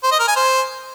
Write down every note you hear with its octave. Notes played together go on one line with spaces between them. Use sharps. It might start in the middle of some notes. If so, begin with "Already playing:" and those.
C5
D#5
A#4
G#5
C5